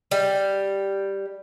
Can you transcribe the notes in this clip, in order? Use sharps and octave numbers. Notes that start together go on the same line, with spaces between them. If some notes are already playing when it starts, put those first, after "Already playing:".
G3